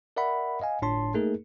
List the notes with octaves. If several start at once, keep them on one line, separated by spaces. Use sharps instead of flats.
A#4 D5 E5 F#5 B5
D#5 F5 G#5
G1 A2 D4 C#5 A5 C6
A3 A#3 D#4 G#4 A#4